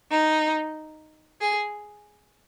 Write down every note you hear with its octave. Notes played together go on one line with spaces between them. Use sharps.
D#4
G#4